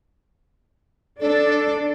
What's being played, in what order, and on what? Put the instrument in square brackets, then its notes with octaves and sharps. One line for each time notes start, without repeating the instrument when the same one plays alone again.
[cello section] D4 [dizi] A4